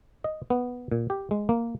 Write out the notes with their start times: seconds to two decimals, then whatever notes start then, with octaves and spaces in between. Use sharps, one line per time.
0.24 D#5
0.50 B3
0.91 A#2
1.10 G4
1.31 G#3
1.49 A#3